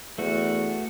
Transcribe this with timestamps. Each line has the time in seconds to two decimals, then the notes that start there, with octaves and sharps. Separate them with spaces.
0.18 E2 A3 F#4